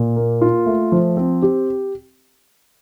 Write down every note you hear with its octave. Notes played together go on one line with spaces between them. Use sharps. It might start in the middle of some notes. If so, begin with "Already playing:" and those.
Already playing: A#2
A#3
F4
A3
F3
C4
G4